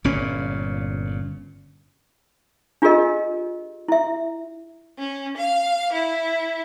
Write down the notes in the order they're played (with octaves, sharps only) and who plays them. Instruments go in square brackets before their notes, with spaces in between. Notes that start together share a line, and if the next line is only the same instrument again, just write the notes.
[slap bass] G1 A#2 C#4
[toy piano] D4 F4 G4 G#4 A#4 D#5
E4 E5
[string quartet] C#4
F5
E4